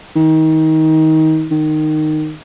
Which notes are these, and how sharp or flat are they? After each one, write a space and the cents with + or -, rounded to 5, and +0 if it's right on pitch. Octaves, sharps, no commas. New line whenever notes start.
D#3 +25
D#3 -15